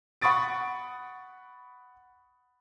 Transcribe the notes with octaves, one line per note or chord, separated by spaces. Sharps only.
F#5 B5 C#6 D#6 A6 D7